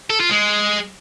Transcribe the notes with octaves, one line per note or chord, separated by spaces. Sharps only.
A4
F4
G#3